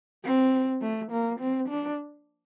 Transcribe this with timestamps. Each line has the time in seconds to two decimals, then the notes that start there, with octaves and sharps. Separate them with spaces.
0.24 C4
0.82 A3
1.11 A#3
1.40 C4
1.69 D4